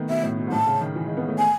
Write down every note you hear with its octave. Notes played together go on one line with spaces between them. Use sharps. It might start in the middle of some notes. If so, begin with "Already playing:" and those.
Already playing: D#3 A3 B3
B2 E5
A2
B2
G#2
A2 A5
C#3
D#3
E3
G#3
B3
A3
G#5